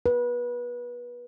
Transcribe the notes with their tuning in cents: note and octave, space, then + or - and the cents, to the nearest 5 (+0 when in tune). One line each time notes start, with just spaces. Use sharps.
B4 -25